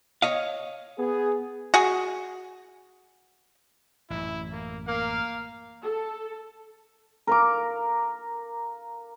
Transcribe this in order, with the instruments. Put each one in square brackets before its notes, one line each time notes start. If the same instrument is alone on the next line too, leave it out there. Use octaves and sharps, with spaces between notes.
[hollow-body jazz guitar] C#5 D#5 F5
[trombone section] B3 G#4
[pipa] F#4 G#4
[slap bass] A1 F#2 [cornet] E4
[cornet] A#3
[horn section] A#3 [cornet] F5
[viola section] A4
[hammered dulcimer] A#4 F5 D6